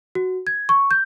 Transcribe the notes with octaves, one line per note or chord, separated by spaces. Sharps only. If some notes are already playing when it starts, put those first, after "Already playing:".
F#4
G#6
C#6
G6